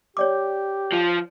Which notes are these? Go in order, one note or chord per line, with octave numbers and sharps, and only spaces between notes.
G4 C#5 D5 D6
F3